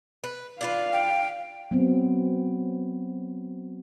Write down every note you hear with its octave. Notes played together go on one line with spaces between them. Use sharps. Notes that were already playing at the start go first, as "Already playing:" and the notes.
B4
D4 F4 B4 F5
G5
F#3 B3 C4